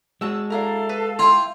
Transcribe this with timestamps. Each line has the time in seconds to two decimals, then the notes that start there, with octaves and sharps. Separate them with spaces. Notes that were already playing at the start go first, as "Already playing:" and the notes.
0.21 G#3 F#4 A5 E6
0.50 D4 E4 A4 F5 A#5
0.89 B4
1.19 E4 F4 G5 C6